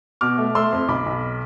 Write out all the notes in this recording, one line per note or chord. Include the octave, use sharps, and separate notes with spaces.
B2 D6 F6
A3
A3 C6 E6
F2
B1 B5 D6
B1